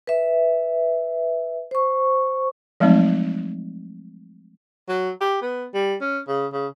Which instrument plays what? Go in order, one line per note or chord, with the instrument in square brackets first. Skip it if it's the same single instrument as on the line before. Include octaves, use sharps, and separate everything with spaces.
[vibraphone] B4 E5
C5 C#6
[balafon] F3 F#3 G#3 A3 C4 D#4
[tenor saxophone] F#3
G4
B3
G3
C#4
C#3
C#3